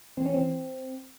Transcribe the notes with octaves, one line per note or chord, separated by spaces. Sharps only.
E3 C4
C#4
E3 C4